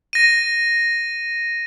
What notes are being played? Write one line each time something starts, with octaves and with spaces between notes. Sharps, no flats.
A#6 D#7